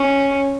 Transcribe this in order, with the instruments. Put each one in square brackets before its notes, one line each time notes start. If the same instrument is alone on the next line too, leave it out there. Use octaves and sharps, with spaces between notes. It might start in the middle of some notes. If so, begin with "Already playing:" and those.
Already playing: [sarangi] C#4